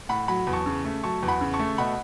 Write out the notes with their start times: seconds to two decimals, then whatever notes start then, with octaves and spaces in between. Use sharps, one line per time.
0.09 A2 F#5 B5
0.28 F#3 F#5 B5
0.47 E2
0.53 A5 C#6
0.66 C#3
0.85 A3
1.04 F#3 A5 C#6
1.23 E2
1.28 F#5 B5
1.41 C#3
1.53 A5 C#6
1.60 A3
1.78 B2 F#5 B5